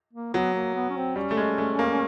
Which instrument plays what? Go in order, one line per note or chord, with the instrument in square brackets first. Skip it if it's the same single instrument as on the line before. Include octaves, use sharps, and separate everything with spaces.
[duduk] A#3
[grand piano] F#3 [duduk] B3
[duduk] A#3
B3
C#4
C4
[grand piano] G3 [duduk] C#4
[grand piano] A3
G#3
A3
A#3